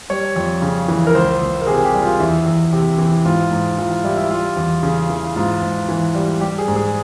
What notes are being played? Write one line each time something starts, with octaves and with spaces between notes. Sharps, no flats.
G3 C#5
F2
C#3
E3
A#4
C#2 C5
C#2
A#4
C3 G#4
G4
G3
F4
E2 E4
E2
C3
E3
G#2 F4
G#2
E3 F4
F4
G3 E4
E4
G3 F4
E2
C#3
E3
G#2 F4
G#2
E3
G3
G3 G4
G#4
G#2
G#4